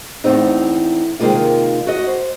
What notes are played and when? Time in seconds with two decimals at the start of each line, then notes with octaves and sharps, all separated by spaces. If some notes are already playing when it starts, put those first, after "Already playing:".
0.24 E2 A2 C4 D#4
1.20 C3 D#3 E3 G#3 A#3 F4
1.87 F#4 D#5
2.07 C5